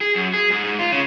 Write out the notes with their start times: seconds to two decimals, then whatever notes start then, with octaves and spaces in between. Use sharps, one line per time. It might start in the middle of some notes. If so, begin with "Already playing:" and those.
0.01 G#4
0.16 F#2
0.33 G#4
0.50 G#2
0.64 G#2
0.79 F4
0.92 C#3